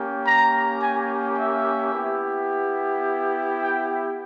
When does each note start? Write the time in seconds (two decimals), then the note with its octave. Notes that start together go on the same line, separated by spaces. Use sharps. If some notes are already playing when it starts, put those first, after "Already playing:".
Already playing: A#3 C#4 G4
0.25 A#5
0.80 G#5
1.37 E5
1.92 B3 E4 G4
3.60 G5